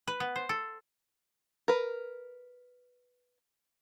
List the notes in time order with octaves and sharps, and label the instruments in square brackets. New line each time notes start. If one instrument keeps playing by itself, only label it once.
[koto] B4
B3
C5
A4
[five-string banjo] A#4 B4